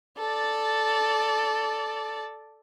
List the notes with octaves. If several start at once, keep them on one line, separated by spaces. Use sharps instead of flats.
A4 D5